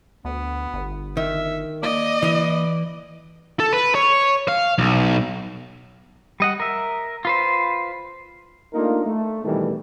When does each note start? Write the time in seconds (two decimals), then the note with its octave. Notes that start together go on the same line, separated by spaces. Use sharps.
0.25 D2 B3
0.74 G1
1.17 D#3 E5
1.83 A#3 D5 D#5
2.22 E3 E4
3.60 A4
3.73 B4
3.95 C#5
4.48 F5
4.78 B1
6.40 G3 D#5 F#5
6.60 A#4 E5
7.25 F4 B4 C5
8.74 A3 A#3 D4 D#4 F4 A#4
9.06 A3
9.44 C2 B2 D#3 E3 G3 A3